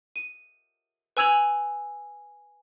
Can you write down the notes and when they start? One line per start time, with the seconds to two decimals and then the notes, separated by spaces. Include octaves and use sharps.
0.16 D#7
1.17 B4 G#5 E6 G#6 F7 F#7